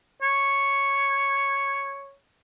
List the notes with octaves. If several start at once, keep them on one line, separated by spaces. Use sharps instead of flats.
C#5